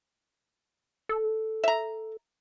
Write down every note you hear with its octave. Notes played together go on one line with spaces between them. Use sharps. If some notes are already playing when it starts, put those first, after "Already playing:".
A4
E5 A#5